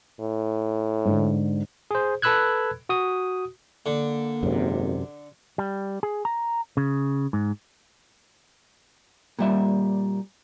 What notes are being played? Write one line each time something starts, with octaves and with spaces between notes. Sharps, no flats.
A2
G#2 D3
G#4 C5
A4 B4 B5 E6 F#6 G#6
F#4 D#6
D3 A#3
G#1 F#2 C3
G3
G#4
A#5
C#3
G#2
A#2 G3 E5